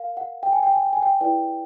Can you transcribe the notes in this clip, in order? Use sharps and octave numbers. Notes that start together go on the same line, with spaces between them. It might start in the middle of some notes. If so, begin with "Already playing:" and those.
Already playing: A#4 F5
F#5
G5
G#5
G5
G#5
G5
G#5
G5
E4 G#4 B4 D5 G5